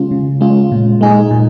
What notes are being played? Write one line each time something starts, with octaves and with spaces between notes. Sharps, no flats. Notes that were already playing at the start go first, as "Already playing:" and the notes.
Already playing: C#3 G#3 C#4 F4
C#3
G#3 C#4 F4
A#2
G#3 D#4 G#4
A#2